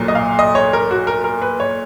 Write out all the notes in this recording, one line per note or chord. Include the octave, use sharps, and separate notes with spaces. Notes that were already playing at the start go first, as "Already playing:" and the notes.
Already playing: B1 A#2 F#3
D#5
F5
D#5
C#5
A#4
F#4
A#4
A#4
B4
C#5